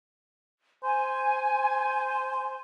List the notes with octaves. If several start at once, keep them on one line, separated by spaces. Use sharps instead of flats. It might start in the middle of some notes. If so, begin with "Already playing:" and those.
C5 G#5